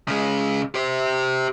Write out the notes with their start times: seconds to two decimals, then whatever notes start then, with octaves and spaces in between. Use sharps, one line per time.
0.08 C#3 G#3
0.75 G4 C5